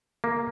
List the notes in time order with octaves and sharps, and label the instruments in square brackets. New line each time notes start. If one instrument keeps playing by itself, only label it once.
[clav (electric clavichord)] A#3